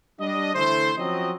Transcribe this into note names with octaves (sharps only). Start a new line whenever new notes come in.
G3 D4 D#5
D3 E3 A3 E4 C5
F3 F#3 C4 C#4 D#5